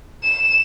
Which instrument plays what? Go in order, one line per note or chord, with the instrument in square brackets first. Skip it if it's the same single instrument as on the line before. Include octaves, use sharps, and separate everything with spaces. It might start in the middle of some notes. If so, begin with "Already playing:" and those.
[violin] E7